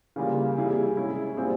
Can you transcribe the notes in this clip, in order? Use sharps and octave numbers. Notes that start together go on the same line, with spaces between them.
C#3 E3 G3 A#3 F4
C3 G3 A#3 E4 G#4
G#3 C#4 E4
A#2 G3 C4 F4 G#4